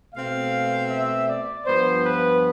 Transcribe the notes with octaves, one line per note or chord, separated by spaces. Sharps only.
B2 A3 C4 F5
E5
D5
G2 F3 B3 C5
B4